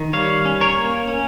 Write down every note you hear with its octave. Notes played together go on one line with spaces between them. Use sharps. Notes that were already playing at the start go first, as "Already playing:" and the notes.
Already playing: D#3
G3 C#5 F5
C#4
A#4 C#5
A#3
C#4